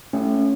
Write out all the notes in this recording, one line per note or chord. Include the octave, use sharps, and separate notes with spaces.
A3 C#4